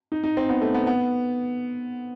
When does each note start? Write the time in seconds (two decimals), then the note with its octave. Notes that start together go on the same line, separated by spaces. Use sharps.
0.12 D#4
0.24 D#4
0.37 C4
0.49 B3
0.62 A3
0.74 B3
0.87 B3